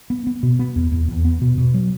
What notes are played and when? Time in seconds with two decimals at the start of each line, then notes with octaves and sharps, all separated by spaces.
0.10 B3
0.27 B3
0.43 B2
0.59 B3
0.76 E2
0.92 E2
1.08 E2
1.25 B3
1.41 B2
1.58 B2
1.74 F#3